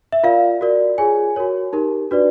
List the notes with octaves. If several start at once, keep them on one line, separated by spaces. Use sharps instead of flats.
E5
F4 A#4 D5 F5
F#4 A#4 D5
F4 G#4 C#5 G#5
F#4 A#4 C#5
D#4 G4 A#4
D4 F#4 B4 D5